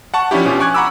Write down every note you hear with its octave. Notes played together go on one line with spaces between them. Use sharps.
F#5 A5 C#6
F3 C#4 D4 E4 G4
B2 C#4 F4 G4
G#5 C#6 D6 F#6 G#6
F#5 A#5 B5 D6 E6